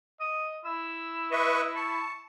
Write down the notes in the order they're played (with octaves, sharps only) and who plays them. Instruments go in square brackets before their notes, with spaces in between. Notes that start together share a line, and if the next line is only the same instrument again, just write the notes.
[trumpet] D#5 [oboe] D#6
[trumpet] E4 [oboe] E6
[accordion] B4 E5 C#6 [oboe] D#5
[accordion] A5 [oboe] C#6